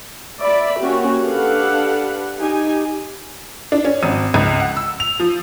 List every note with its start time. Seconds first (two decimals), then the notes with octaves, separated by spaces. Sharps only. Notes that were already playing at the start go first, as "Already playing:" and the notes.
0.41 D5 E5 B5
0.80 A#3 C#4 F#4 G4
1.21 D4 G4 A4 B4 F5 F#5
2.38 D#4 G4 G#5
3.72 D4
3.85 C#4
4.03 G#1
4.34 C#2
4.60 F#5
4.77 E6
5.00 F7
5.20 F3